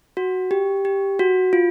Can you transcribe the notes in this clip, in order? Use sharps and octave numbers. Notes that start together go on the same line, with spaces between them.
F#4
G4
G4
F#4
F4